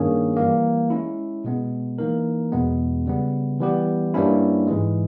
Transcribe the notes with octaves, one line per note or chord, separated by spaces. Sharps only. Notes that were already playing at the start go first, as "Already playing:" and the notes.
Already playing: G2 D#3 A#3 C#4 G#4
E3 G3 A#3
G#3 C#4 E4
B2 G#3 B3
E3 A#3 D#4 A#4
E2 B2 G#3 B3
C#3 G3 B3
E3 G3 B3 G4
G2 G3 A#3 C#4 E4
G#2 E3 G#3